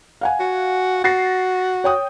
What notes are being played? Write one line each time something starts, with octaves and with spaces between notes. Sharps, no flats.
F5 F#5 G#5
F#4
F#4 A6 A#6 C7
C#5 G5 D#6